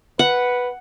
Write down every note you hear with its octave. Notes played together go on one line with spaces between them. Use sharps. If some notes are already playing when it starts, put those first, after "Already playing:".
B4 F#5